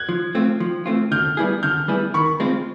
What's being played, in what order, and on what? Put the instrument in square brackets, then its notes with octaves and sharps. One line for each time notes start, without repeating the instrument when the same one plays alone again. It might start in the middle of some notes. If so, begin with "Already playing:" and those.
Already playing: [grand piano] F#6 G#6
[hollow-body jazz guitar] F3
A3 C4 F4
F3
A3 C4 F4
[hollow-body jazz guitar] D3 [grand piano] F6 G6
[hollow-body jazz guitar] G3 B3 E4 G#4
[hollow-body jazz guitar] D3 [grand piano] F6 G6
[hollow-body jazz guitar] G3 B3 E4 G#4
[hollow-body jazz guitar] D#3 [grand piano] B5 C#6
[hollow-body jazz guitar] G#3 C4 F4